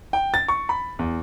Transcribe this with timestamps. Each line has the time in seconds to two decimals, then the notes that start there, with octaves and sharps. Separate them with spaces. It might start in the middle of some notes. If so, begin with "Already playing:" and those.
0.13 G5
0.34 A6
0.48 C#6
0.69 B5
0.99 E2